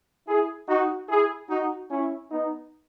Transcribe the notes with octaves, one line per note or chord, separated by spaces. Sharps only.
E4 G#4
D#4 F#4
E4 G#4
D#4 F#4
C#4 E4
B3 D#4